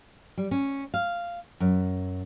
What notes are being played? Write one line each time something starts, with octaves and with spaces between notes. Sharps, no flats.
G3
C#4
F5
F#2